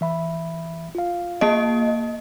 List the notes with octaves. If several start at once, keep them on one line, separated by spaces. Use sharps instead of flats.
E3 E5 B5
F4 F5
A#3 D#5